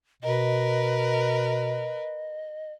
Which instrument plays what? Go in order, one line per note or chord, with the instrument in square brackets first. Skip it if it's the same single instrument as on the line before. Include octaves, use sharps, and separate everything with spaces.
[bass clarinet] B2 [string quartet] A#4 B4 [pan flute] D#5